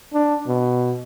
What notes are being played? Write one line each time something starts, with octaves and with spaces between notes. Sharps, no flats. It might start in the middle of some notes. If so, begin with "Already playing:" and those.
D4
B2